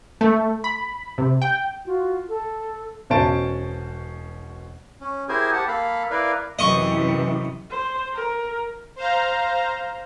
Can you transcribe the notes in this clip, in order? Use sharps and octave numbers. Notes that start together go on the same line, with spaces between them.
A3
B5
C3
G5
F4 F#4
A4
E1 B2 C#4 C5 A5 D7
C#4
E4 G4 G#4 A#4 C5 G#5
G4 F#5 A5
A#3 A4 F5 B5
E4 A#4 B4 D5 F5
F#2 C3 E3 D#5 C#6
C5
A#4
C5 F5 A#5